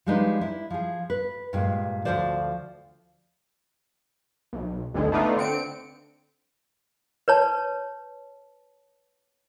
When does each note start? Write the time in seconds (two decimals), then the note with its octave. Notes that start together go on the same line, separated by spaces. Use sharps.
0.06 F3 G3 G#3 D4 D#4 B4
0.41 E4
0.70 F3 G#4
1.10 B4
1.53 G2 A#2 G#3
2.05 D2 G2 F3 F#4 C5 D5
4.53 B1
4.94 G#1 D2 G#2 D3 G#3
5.12 A3 B3 D4 D#4 F4
5.36 D3 C4 C#7 D7
7.28 B4 C#5 A5